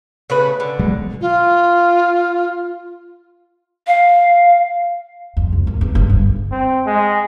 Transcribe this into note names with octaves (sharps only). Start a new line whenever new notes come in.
C#3 A3 B4
D3
B2 F#3 G#3
F4
F5
F2
C2
G#1
E2
G1
G2
C4
G#3